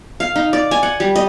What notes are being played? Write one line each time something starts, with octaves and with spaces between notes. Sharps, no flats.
F5
D#4
D5
G#5
F#5
G3
D#5